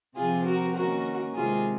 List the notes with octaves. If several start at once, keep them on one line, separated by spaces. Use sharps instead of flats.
C3 F3 C4 F4 G#4
F#4 A#4
D#3 A#3 C#4 F#4 A#4
C3 D#3 G#3 C4 F4 G#4